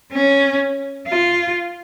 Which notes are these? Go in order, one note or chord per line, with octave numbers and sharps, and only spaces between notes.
C#4
F4